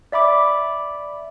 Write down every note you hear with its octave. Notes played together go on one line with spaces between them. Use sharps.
D5 E5 B5 D6